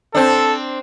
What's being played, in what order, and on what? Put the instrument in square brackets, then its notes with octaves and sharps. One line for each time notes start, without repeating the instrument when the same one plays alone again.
[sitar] C4 D4 [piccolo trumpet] A4